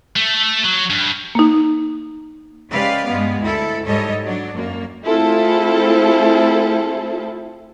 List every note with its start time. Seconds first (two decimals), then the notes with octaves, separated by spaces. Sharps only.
0.16 A3
0.65 F#3
0.90 G2
1.35 A#3 D#4
2.71 C#3 G#3 G4 B4 D5 F5
3.07 G2 G3 G#3 B3
3.41 D2 E4 A4
3.86 G#2 G3 A4 C#5 D#5
4.23 F#3 D4
4.54 F#2 A#3
5.06 A3 C4 E4 F4 G#4 A4